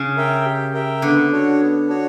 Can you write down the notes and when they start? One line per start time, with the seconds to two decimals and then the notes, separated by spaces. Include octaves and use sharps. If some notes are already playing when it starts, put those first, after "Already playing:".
Already playing: C#3
0.17 A#4 E5 G5
0.46 G4
0.74 A#4 E5 G5
1.02 D3 B3
1.32 D4 F#4 C#5
1.61 B3
1.88 D4 F#4 C#5